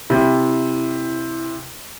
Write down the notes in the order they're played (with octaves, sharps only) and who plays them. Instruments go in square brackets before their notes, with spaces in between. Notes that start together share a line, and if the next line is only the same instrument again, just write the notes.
[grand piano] C3 [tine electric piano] E4